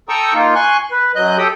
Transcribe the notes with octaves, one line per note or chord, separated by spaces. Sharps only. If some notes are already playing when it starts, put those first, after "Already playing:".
A4 G5 A#5 C#6 D#6 E6
A#3 D#4 F4
G#5 C6 C#6 F#6
B4
F#2 F#3 D#5 F#6 G6
G4 A4 G5 D#6